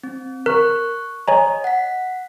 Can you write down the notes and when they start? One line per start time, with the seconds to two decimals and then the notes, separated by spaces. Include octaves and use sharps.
0.04 C4
0.46 A#4 C#6 F#6
1.28 C#5 D#5 G#5 A#5
1.64 F#5 B6